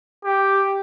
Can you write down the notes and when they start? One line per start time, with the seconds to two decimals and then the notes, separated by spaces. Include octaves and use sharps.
0.24 G4